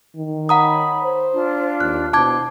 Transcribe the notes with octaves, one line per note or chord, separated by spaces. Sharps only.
D#3
C#5 F#5 A#5 B5 D#6
C5
D4 F4
D#2 F#6
B2 D4 E4 C5 A5 D6 G#6